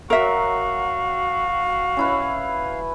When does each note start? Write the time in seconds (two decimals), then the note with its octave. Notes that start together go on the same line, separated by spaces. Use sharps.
0.10 F#3 F#4 A#4 E5 F5
1.97 C#4 E4 B4